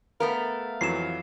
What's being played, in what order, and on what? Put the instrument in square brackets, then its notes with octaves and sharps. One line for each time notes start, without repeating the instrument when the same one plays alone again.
[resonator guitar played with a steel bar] A3 B3 A#4 [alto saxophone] F5
[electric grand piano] F2 E3 F#3 [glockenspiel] C7 E7